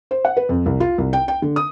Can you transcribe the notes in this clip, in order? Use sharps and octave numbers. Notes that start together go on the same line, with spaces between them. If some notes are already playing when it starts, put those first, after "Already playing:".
C5
F#5
B4
F2
C2
F4
C2
G5
G5
D3
D#6